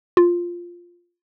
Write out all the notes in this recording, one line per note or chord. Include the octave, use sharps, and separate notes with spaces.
F4